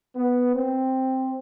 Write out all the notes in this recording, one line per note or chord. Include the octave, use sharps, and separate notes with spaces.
B3
C4